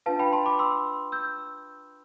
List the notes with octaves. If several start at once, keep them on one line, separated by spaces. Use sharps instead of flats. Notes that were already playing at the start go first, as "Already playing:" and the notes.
D4 F4 B4 F5 A5
G5 B5
A5 C6
B5 D6
C6 E6
E6 G6